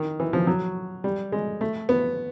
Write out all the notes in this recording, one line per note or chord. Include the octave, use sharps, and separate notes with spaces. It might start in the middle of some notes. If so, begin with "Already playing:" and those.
Already playing: D#3
E3
F3
F#3
G3
G#3
A3
B3